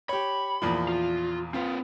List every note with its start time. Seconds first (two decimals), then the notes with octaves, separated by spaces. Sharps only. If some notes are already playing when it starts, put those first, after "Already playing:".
0.09 G4 C#5 B5
0.62 E2 A#2 F3
0.88 F4
1.54 C4 F4 B4